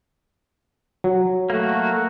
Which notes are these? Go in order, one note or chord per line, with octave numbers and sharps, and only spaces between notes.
F#3
A3 A#3 F#4